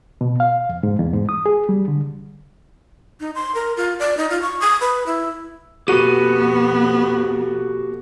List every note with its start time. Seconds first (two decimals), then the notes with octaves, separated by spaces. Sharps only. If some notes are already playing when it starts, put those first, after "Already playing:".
0.21 B2
0.40 F5
0.69 F2
0.83 G#2
0.99 E2
1.14 G#2
1.29 D#6
1.46 G#4
1.69 G3
1.88 D3
3.20 D#4
3.35 C6
3.55 A#4
3.77 F4
3.99 D5
4.17 D#4
4.30 F4
4.42 C#6
4.60 D#6
4.81 B4
5.06 E4
5.88 F2 B2 A#3 B3 F#4 G4 A4 D#7